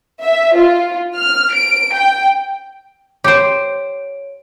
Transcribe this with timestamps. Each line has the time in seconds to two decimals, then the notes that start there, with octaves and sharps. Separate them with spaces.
0.22 E5
0.58 F4
1.18 F6
1.54 D7
1.97 G5
3.24 G4 C5 C#5 D7